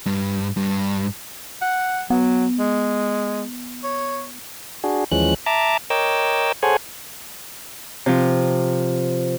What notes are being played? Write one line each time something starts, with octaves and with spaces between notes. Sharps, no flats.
G2
G2
F#5
F#3 B3
G#3
C#5
D4 F#4 G#4
D#2 E3 F3 G#3 C#4 F#6
E5 A5 A#5 D6
A#4 C#5 D#5 G5 D6 E6
G#4 A4 C5 C#5 F#5 G#5
C3 F3